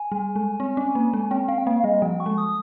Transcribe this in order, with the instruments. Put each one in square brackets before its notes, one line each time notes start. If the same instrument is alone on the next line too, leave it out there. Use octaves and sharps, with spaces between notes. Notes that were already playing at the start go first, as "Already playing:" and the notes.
Already playing: [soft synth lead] G#5
[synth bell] G3
G#3
C4
C#4
A#3
G#3
[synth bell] C4 [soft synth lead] G5
[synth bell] C4 [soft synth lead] F5
[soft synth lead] G5
[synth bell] A#3 [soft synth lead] F5
[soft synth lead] F5
[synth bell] G3 [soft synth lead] D#5
[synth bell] F3 [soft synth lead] G5
[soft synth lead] C#6
[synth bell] G#3
[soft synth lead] D#6